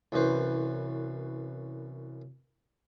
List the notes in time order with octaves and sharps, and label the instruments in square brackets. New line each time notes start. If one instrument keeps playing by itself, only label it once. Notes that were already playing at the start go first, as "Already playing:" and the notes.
[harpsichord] C2 F#2 E3 B4 C5